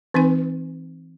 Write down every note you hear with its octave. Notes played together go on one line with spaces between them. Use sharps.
E3 C4 D#4 B4 G#5